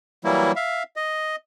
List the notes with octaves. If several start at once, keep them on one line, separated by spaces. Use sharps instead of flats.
E3 F#3 G3 A#3 E4
E5 F5
D#5